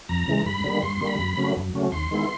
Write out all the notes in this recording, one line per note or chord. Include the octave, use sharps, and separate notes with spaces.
F2 A#5
C#3 E3 G#3
G2 B5
D3 G3 A#3
G2 C6
C6
D3 G3 A#3
B5
F#2
C#3 F#3 A3 C#4
F#2
C#3 F#3 A3 C#4
D#2 C6
D#3 G#3 B3 E4